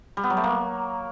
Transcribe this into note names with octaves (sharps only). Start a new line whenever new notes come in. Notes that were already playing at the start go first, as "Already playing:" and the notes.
G3
B3
F#3
A3
A#3